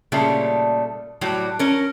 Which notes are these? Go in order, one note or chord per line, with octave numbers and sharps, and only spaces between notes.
A#2 C#3 G3 A3
A2 F#3 G3 G4
C#4 A#4